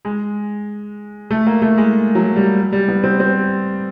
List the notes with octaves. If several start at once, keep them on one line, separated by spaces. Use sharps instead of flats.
G#3
A3
A#3
A3
G#3
F#3
G3
G3
B3
C4
C4